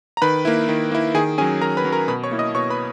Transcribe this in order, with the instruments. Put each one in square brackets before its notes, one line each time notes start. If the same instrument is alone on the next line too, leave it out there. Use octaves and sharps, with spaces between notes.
[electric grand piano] A#5
D#3 B4 B5
A#3 E4
D#3
A#3 E4
D#3 G#4 G#5
C#4 G#4 G#5
F#3
D#3 A#4 A#5
B4 B5
F#3 C#4
A#4 A#5
B2 B4 B5
C#5 C#6
A#3 E4
D#5 D#6
B2 C#5 C#6
B4 B5